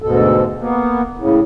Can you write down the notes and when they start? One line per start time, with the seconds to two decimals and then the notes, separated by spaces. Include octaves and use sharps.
0.02 D2 G#2 B2 A4
0.60 A#3 B3
1.19 A2 C#3